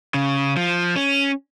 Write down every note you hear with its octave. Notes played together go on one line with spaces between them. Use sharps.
C#3
F3
C#4